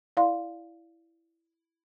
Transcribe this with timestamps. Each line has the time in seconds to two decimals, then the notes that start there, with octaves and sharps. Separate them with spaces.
0.17 E4 D5 F5 C6